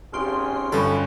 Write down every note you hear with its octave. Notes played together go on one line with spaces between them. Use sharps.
G#1 C#4 G4 G#4 C6 F6
B1 G2 D3 C#4 F4 A4 B5